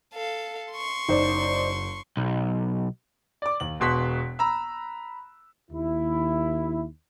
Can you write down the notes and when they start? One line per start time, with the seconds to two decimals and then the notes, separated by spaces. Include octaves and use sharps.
0.14 A4 F5
0.73 C6 C#6
1.09 F#1 D#4 C5 D5
2.17 B1
3.42 D5 D6
3.60 D#2 F#7
3.80 E1 B2 C6 F#6 B6
4.39 A#5 B5 E6
5.71 D#2 E4